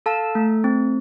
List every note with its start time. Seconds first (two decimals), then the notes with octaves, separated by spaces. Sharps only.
0.06 A4 F5 A5
0.35 A3
0.64 C4